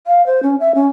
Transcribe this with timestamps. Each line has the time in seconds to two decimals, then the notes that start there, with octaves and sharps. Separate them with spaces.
0.07 F5
0.26 C5
0.43 C#4
0.60 E5
0.75 C#4